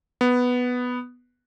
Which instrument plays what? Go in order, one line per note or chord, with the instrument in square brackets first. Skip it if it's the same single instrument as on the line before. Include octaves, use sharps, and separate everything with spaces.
[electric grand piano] B3